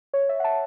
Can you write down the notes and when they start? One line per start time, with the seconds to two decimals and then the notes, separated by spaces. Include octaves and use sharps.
0.14 C#5
0.29 E5
0.40 F#5
0.44 A5